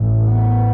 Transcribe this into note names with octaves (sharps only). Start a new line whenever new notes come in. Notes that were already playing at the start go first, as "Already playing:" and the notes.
Already playing: A1 A2
B3